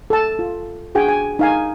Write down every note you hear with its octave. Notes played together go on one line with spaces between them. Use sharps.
A4 A5
F4
D4 F#4 G#4 G5 G#5
G#5
D#4 F5 G#5